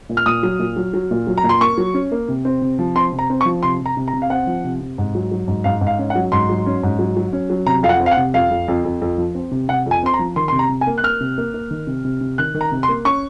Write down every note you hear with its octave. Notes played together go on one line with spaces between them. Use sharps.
A#2
F6
A#2 D#6
F#3
A#2
F#3
F#3
A#2
F#3
A#5
A#2
C6
A#3 C#6
F#3
C#4
A#3
C3
C4
C3
F3
C4 C6
C3
A#5
C4
C#6
F3
C3 C6
C3
A#5
C3
A#5
C3
F5
C4 F#5
F3
C3
C3
G#2
F#3
F#3
G#2
G#2 F5
G#2
F5
C#4
F#5
F#3
G#2 C6
F#3
C#4
G#2
F#3
F#3
C#4
F#3
C3 A#5
F2 F5
F#5
C4
F5
F#5
C3
F2 F5
F2
F2
F2
F2
F3
C4
C3
C3 F#5
F2
G#5
C4 C6
A#5
F3
D#3 C6
C3 C6
A#5
C3
G#5
A#3
F#6
A#3 F6
C3
A#3
A#3
D#3
C3
C3
C3
D#3 F#6
D#3
A#5
C3
C6
A#3
C#4 C#6